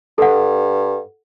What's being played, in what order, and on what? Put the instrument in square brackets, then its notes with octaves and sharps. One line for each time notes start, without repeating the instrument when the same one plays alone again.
[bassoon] G2 [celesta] A4 F#5